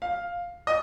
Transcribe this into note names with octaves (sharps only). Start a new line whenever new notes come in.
F5
D#5